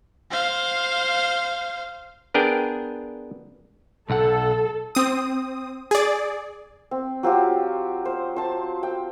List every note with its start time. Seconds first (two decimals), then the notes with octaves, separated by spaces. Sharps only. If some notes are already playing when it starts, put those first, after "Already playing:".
0.31 C5 F5
2.34 B3 D4 G#4 A#4 G5
4.10 B1 A4 F#5
4.95 C4 D#6
5.91 G#4 D5
6.91 C4
7.23 F#3 C4 F4 G4
8.05 C5
8.36 C5 A5
8.83 G5